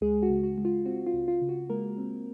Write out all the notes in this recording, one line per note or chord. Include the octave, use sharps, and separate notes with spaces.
C#2 G#3 G#4
F#4
C#3
F#4
G#3
F4
C4 F#4
F4
C#2
F4
C#3
F#4
G#3 A#3 A#4
C4